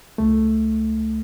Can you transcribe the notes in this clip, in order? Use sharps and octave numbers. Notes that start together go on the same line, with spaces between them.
C#2 A3